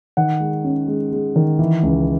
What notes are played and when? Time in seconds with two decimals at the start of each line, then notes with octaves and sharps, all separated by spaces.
0.17 D#3 F#5
0.40 G#3
0.64 C#4
0.88 G#3
1.12 G#3
1.36 D#3
1.59 E3
1.83 C#2